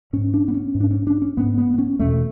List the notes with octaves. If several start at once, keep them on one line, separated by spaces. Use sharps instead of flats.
G#2 C#4
D4
B3
C#4
G#2
D4
C#4
D4
C#4
G#2 B3
B3
B3
C#4
E2 B2 A3